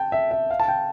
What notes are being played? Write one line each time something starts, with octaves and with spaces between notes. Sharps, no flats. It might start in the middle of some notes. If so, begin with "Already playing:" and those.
Already playing: G5 A5
E5
E5
F5
A5
G5